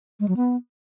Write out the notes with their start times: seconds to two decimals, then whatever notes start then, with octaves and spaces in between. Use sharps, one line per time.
0.20 G#3
0.28 F#3
0.36 B3